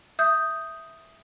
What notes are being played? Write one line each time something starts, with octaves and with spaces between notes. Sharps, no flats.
E5 D#6 G6